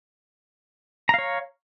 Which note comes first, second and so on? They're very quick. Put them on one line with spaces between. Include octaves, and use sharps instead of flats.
A#5 F5 C#5